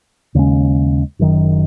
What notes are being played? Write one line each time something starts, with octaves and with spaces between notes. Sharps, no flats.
D#2 C#3 G#3 C#4
F#1 F#2 D#3